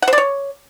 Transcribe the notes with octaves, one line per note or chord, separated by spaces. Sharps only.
F#5
C5
D5
C#5